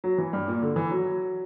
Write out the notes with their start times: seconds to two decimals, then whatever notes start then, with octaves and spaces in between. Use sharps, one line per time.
0.04 F#3
0.18 E3
0.33 G2
0.48 A#2
0.62 D3
0.76 E3
0.91 F#3